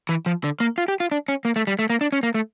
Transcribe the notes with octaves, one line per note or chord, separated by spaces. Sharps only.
E3
F3
D3
A#3
F4
G4
F4
D4
C#4
A#3
A3
G3
A3
A#3
D4
C#4
A#3
A3